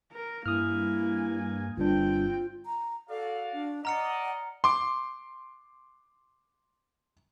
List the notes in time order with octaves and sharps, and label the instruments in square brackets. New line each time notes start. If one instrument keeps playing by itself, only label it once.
[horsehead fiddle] A#4
[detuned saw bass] G2 [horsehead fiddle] A#3 G#5 [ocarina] E4 [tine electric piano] D#6 F6
[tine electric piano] G1 G2 D4 [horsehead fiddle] C4 G5 [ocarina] F4
[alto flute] A#5
[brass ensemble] F#4 D5 F5 [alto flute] A4
[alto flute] D4
[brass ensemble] D5 D#5 [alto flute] F#5 [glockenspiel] A#5 F6 C#7
[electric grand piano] C6 D6